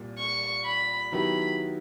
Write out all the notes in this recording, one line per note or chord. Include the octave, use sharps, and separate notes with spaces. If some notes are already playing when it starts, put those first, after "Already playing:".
Already playing: C2 A#2 G3
C#6
B5
D#3 F#3 B3 E4 G4 B5